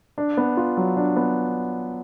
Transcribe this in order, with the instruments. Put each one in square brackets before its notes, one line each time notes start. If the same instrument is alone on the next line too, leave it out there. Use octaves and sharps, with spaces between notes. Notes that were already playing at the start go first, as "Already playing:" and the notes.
[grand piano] D4
B3
F4
F#3
D4
B3